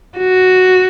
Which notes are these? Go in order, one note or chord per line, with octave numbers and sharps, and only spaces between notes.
F#4